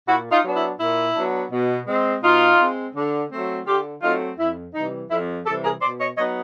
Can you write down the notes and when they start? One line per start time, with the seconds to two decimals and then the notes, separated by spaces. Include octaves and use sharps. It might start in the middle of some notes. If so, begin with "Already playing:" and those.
0.08 A#2 E4 F#4
0.32 D#4 F4
0.44 F#3 B3 D4
0.56 E4
0.80 A#2 E4
1.16 F#3 B3 D4
1.52 B2
1.87 G#3 C4
2.23 B2 D#4 F4
2.59 G#3 C4
2.95 D3
3.31 F#3 A3 C4
3.66 D3 F4 G4
4.02 F#3 A3 C4 D#4 F4
4.38 F2 E4
4.74 C3 E3 G3 D#4
5.10 F2 E4
5.46 C3 E3 G3 G4 A4
5.64 G#4 A#4
5.81 B2 C5 D5
6.00 C#5 D#5
6.17 F#3 B3 D#4 C#5 D#5